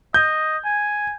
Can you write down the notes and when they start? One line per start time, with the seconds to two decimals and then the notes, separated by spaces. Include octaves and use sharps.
0.14 D#5 G6
0.65 G#5